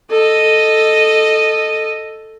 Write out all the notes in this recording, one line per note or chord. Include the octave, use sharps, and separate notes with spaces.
A4 D#5